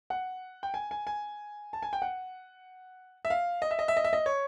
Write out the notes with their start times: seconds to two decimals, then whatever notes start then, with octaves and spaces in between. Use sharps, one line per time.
0.10 F#5
0.63 G5
0.74 G#5
0.91 G#5
1.07 G#5
1.73 A5
1.82 G#5
1.93 G5
2.02 F#5
3.25 E5
3.30 F5
3.62 D#5
3.71 E5
3.79 D#5
3.88 E5
3.97 D#5
4.04 E5
4.13 D#5
4.26 C#5